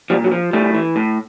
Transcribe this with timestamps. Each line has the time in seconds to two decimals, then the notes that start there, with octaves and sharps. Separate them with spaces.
0.10 A#2 F3 G3
0.24 F#3
0.31 F3
0.53 A2 G3 A3
0.74 E3
0.96 A2